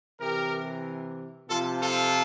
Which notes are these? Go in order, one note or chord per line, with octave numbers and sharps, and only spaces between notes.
C3 E3 G4 A#4
C3 F3 F4 A4
F4 A4